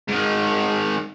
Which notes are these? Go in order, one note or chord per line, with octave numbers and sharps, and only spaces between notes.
G#2 D#3